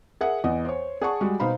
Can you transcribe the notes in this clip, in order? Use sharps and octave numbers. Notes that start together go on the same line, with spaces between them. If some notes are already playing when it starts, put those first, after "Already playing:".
G#4 A#4 E5 F#5
E2 B3 D#5
C5 C#5
G#4 D5 F#5 A5 C#6
G3 G#3 F#4
B2 D#4 C5 F5 B5